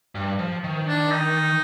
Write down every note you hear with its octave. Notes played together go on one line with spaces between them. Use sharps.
G2
F3
D#3
D4
D#4